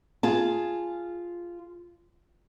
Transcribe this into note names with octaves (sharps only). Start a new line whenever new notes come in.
F4 G#4 A5